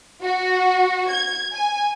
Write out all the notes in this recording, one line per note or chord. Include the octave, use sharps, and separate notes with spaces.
F#4
G#6
G#5